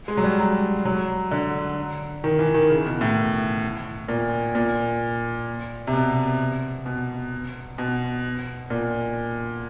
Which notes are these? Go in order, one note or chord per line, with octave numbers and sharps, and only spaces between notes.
G#3
F#3
G3
F#3
F#3
D3
D#3
E3
D#3
C#3
B2
A2
A#2
A#2
C3
B2
B2
B2
A#2